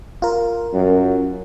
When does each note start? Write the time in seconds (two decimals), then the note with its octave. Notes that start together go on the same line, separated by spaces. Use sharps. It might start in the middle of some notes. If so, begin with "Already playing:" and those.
0.22 F4 A#4
0.74 F#2